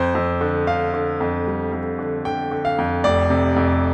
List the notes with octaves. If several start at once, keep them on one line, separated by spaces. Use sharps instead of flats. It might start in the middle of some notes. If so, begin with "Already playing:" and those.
Already playing: F2 C5
F2
D3
D3 F5
D3
F2
G3
F2
D3
D3 G5
D3
F5
F2
F1 D5
C3
F2